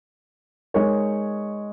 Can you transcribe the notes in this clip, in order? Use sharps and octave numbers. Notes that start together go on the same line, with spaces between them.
G#3 D#4 A#4 C#5